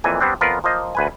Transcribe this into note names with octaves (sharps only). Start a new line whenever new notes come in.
F2 A#2 E3 G#5
G3 B3 C4 D4
F2 B3 F4 A#4 B4
F3 A#3 C5 D#5
D2 B4 G#5